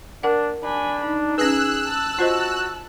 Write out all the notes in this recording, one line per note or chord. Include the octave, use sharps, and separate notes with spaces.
D4 A#4 F#5
D4 G#5 B5
D#4
C#4 G#4 B4 E6 F#6
A5
F4 F#4 C5 D#5